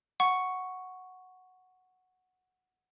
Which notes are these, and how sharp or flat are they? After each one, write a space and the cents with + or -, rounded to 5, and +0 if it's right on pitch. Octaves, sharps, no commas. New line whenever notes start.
F#5 +0 C#6 +0